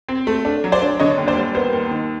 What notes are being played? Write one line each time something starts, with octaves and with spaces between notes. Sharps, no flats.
C4
A3
D4
F#3
C5 D5
D4
D3 C#5 D#5
D#2
C5 D5
G3
B3 A#4 C5
D#2
D#3